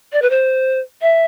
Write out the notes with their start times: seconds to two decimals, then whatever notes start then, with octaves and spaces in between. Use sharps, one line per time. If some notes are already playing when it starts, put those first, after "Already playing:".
0.13 D5
0.22 B4
0.30 C5
1.02 E5